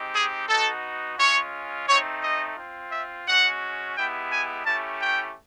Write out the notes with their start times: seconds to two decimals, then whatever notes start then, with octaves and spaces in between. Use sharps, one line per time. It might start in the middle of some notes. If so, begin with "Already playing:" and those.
Already playing: G#3 C4 D#4 G4
0.14 G#4
0.48 B3 D#4 F#4 A4
1.17 G#3 C#4 F4 C#5
1.88 A3 C4 D#4 C#5
2.23 D#5
2.58 C4 F4
2.91 E5
3.26 G#3 C#4 F#4 F#5
3.96 G#3 B3 E4 G4 G5
4.32 G#5
4.65 A3 C#4 E4 G4 A5
5.01 G5